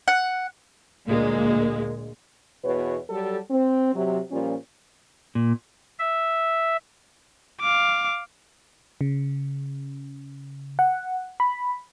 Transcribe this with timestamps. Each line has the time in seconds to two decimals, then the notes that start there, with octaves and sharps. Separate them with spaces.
0.08 F#5
1.08 D2 A#2 G#3 A#3
2.64 E2 B2 B4 C#5
3.10 F#3 G3 A4
3.51 C4
3.94 C3 F#3
4.31 A#2 F3 G3 C#4
5.35 A#2
5.99 E5
7.61 F5 D6
9.01 C#3
10.79 F#5
11.40 B5